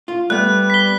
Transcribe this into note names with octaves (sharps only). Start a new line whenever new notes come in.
F4
G3 A3 B3 F#6
B6 G7